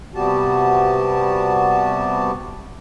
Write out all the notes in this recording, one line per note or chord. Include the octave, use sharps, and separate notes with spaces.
C3 G3 B3 F#4 G4 A5